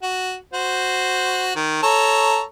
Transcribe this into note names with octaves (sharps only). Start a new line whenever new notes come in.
F#4
F#4 C5
D#3
A4 C#5 A#5